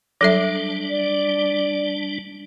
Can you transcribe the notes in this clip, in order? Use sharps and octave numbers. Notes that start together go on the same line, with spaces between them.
F#3 G3 D4 A4 E5
D5